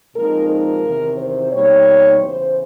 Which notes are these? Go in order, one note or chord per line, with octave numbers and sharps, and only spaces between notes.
A#2 F3 G#3 C4 D#4 A#4
A#4
E2 C3 D#3
C5
B2 G3 A#3 D#4 C#5
E2 C#3 E3 C5